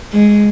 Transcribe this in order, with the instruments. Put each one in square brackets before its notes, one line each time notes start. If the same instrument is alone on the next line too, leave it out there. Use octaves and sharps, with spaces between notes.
[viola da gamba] G#3